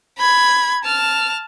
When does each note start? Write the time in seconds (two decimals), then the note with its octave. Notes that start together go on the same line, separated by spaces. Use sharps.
0.19 B5 G#6
0.85 A5 F6